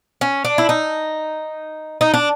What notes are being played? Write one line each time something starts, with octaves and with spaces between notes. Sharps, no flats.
C#4
D4
E4
D#4
D#4
D4